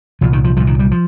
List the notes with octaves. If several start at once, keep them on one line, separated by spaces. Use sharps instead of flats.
C2 A#2 F3
D#3
F3
C2 A#2 F3
D#3
G3
F3